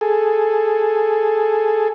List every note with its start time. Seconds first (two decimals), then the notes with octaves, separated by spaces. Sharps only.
0.01 G#4 A4